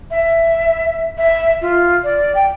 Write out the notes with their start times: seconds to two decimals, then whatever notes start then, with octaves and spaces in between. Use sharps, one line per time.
0.11 E5
1.18 E5
1.62 F4
2.04 D5
2.35 G5